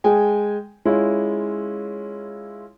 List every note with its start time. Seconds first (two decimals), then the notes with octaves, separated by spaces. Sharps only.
0.04 G#3 G#4 G5 G#5
0.85 G#3 C#4 E4 F4